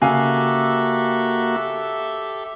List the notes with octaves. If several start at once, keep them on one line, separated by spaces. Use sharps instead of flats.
C#3 A#3 F#4 G4 A4 E5 F5 G#5